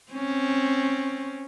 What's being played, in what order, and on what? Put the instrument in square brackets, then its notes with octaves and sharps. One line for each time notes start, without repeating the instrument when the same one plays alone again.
[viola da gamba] C4 C#4